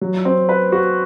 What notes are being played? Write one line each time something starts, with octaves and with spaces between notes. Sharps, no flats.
F#3
C4
B4
F#4